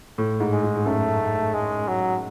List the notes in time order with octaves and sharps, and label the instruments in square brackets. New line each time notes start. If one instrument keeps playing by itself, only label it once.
[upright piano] A2
G#2
[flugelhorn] G#3
[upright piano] G#2
G#2
[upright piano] F#2 [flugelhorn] A3
[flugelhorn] G#3
F#3